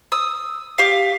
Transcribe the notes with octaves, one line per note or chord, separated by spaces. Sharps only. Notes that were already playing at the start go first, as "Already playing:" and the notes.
D#6 E6
G4 F5